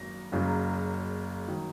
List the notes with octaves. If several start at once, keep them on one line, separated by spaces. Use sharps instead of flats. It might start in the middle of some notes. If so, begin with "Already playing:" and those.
Already playing: G#1 F#2 D#3 A#3 A#6
F#1 F#2 C#3 F#3
D#3 F#3